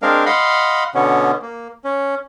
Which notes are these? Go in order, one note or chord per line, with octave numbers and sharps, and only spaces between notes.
G#3 C4 D4 A#4 F5
D#5 F5 F#5 B5 C6
B2 D3 B3 C#4
A#3
C#4